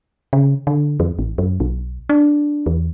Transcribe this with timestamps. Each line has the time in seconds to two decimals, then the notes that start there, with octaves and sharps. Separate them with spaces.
0.33 C#3
0.67 D3
1.00 F2
1.19 A1
1.38 F#2
1.60 B1
2.09 D4
2.66 E2